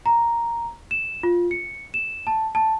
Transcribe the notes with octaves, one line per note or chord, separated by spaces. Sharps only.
A#5
E7
F4
C#7
E7
A5
A5